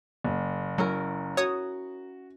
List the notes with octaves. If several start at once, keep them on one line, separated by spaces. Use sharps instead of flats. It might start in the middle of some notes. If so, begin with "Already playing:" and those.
F#1
F#3 C#4 E4 A#4
F#4 C#5 D#6